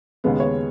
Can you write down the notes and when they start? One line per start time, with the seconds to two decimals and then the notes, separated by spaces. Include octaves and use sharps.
0.24 D#2 C#3 G#3 B3
0.40 C#5